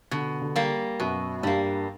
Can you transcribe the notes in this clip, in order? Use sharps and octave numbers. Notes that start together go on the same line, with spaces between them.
B2 D3
D3
G3 A#3
F#2 B2
G2 G3 A#3